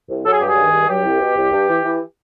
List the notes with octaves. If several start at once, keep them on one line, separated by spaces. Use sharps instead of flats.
C2
F#3 A4
G#4
G2 G4
G#4
D#3
G2
F#3 G4
C2
B2
C2
G2
E3
E3